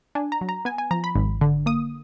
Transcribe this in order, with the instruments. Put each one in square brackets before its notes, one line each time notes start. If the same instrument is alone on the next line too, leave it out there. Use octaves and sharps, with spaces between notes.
[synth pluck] D4 G#5
A#5
F#3
A#5
B3 G#5
G#5
F3 A#5
B5
G#1
D3
A#3 D#6